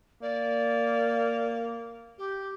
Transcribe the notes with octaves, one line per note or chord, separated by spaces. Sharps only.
A#3 D5
G4